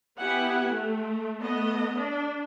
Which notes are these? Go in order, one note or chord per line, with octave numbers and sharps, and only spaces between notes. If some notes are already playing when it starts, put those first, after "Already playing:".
B3 E4 G4 F#5 G#5
A3
A3 B3 D#5
D4